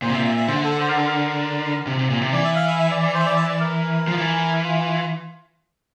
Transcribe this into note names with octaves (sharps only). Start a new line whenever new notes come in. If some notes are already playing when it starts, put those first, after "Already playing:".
A#2 C5
C3
A#2 E5
E5
E5
D3 C5
A4
C5
A#4
A4
A#4
C3
C3
A#2
C3
E3 D5
E5
F5
E5
E5
D5
D5
C5
E5
D5
E5
D5
A#4
F3
E3
F4